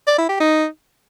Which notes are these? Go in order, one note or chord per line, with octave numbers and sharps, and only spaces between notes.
D5
E4
G4
D#4